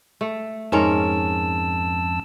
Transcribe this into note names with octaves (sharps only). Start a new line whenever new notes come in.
A3
F2 G#2 C#4 A#4 A5 E6